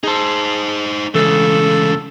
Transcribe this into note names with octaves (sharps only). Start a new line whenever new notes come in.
D#4 G#4 C5 A5
D2 C#3 E3 G#3 A4